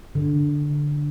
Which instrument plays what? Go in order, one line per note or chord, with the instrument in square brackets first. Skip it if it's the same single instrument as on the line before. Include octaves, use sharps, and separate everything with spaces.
[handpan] D3